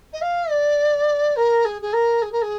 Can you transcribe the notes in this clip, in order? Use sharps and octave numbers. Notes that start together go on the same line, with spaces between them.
D#5
F5
D5
A#4
G#4
G#4
A#4
G#4
A#4
G#4